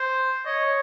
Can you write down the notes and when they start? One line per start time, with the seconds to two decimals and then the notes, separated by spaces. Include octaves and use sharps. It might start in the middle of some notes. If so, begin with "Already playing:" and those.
Already playing: C5
0.46 C#5 D#5